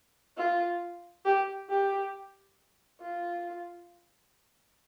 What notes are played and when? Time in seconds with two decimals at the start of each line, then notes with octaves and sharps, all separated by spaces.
0.37 F4
1.25 G4
1.70 G4
3.01 F4